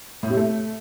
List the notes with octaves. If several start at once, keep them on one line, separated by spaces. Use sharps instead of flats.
A2
C3
A3